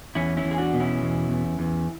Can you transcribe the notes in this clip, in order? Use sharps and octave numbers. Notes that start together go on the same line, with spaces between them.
E2 C#4 E4
C#4 E4
E2
G#4
D4 F#4
B2
C#4 E4
E2
E2
E2